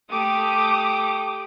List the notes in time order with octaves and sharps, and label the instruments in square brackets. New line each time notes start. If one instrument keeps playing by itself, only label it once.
[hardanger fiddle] A3 G4 [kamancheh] D6 D#6